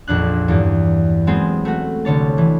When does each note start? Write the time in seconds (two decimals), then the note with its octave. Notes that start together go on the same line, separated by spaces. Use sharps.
0.07 A#1 F2 D4 F#6
0.48 E2 G2 A#3
1.27 F#3 G#3 B3 C4 G#4
1.65 A3 F#4
2.05 C2 D3 C#5 A5
2.38 E3